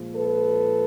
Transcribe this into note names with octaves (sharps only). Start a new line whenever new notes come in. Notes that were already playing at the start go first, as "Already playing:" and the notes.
Already playing: A#2 F3 G#3
A4 B4